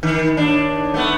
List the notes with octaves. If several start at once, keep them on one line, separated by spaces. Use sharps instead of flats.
D#3
D#2 D4
A3 B3